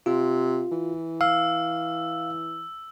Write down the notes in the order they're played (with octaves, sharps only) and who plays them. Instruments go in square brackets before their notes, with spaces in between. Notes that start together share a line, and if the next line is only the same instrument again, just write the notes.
[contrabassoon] C3 [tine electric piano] F4
[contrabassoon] E3
[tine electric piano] F5 [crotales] E6